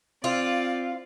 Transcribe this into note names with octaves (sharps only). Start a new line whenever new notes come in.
C4 F4 D5 F5